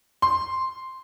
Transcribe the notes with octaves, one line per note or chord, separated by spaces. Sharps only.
C6